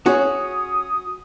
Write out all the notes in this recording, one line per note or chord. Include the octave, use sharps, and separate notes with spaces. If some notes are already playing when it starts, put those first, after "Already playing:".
C#4 F#4 G#4 C#5 D#6